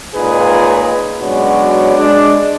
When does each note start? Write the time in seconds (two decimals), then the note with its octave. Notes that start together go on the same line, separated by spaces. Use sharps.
0.14 C#2 A#2 D#4 G#4 B4
1.21 F#3 G#3 B3 C#4 D4 F#4
1.98 G#3 D4